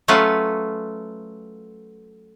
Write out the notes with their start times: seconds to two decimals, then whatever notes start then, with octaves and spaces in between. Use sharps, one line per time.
0.08 F#3 A3 C#4 F4 B4 F#5